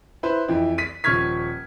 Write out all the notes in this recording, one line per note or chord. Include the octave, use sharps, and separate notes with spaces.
E4 B4 C5
F2 E3 E4
B6 D#7
D#1 F3 C#6 F6 G#6 B6